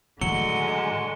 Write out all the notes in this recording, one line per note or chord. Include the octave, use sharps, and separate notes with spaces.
A2 D3 D#3 F#3 G#3 C#7 G7